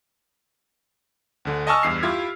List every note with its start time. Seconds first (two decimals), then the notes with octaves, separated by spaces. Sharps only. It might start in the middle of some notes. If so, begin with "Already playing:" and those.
1.45 D2 D3
1.67 D#5 G#5 A5 C#6 E6 F6
1.83 E2 G2 C7
2.03 E4 F4 G4 G#6